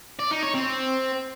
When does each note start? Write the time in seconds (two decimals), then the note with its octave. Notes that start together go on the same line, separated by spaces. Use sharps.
0.19 D5
0.31 D#4
0.43 C#5
0.54 C4